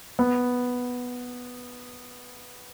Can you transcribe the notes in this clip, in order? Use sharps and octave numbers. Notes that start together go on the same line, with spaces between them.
B3